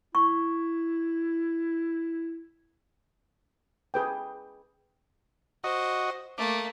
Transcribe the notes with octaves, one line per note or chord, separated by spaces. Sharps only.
E4 C#6
G#4 B4 G5
F#4 C5 D#5
A3 A#3 D6